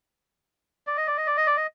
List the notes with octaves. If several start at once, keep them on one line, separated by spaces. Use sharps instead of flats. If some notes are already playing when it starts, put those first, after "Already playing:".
D5
D#5
D5
D#5
D5
D#5
D5
D#5